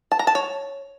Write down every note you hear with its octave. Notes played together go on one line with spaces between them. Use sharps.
A5
A#5
A5
C#5